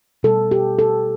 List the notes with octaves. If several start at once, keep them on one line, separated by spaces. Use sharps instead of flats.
B2 G3 A4
G4
A4